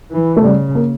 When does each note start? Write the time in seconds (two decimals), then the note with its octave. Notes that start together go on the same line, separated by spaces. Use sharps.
0.12 E3
0.36 A3
0.43 C#3 G3
0.75 A#3